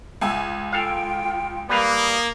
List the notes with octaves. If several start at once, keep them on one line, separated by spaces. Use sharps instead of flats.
C#2 E5 G#5
F4 A4 F5 G5
G3 A#3 B4 F5 D#6